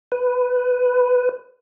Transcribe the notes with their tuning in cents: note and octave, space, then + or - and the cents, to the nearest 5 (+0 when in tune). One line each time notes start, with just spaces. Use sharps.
B4 +10